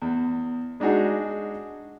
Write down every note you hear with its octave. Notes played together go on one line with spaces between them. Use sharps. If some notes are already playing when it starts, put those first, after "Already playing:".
E2
G#3 D4 D#4 F#4 G#4